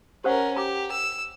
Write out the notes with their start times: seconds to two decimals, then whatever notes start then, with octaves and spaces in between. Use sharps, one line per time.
0.24 C#4 G4 A#4 C5 F#5
0.56 G4 A#5 D6
0.91 E6